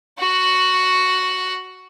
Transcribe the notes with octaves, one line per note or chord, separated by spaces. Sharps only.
F#4 F#5